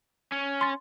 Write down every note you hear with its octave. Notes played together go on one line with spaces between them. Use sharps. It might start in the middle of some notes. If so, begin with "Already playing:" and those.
C#4
C6 A6